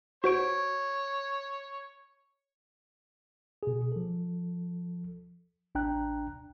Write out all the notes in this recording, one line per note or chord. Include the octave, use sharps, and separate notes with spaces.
F#4 C5 C#5 D7
B2 G#4
F3 A4
A1 D4 G5 A#5 F#6